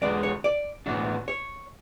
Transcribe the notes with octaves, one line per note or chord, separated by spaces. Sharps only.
E2 D3 G#3 B3 D5
C#5
D5
A2 E3 B3 D4 F#4
C#5